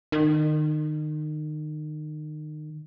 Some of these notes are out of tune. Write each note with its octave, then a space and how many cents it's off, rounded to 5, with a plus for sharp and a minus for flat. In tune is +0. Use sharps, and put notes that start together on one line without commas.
D#3 -30